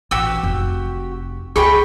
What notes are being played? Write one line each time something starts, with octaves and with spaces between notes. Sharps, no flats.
A1 F#4 G4 E6
F1
C#2 G#4 G5 B5 C#6